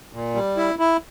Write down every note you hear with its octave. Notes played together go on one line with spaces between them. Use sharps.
A#2
G3
E4
E4